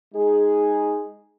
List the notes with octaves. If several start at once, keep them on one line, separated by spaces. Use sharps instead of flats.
G#3 D#4 G#4